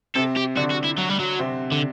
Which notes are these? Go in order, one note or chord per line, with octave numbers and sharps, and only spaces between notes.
C3 C4 A4
G4
D3 D4 F#4
F#4
E4
F#3
G3
F#3
C3 C4
D3